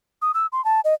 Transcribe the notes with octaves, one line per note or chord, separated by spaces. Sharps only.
D#6
E6
C6
A5
D#5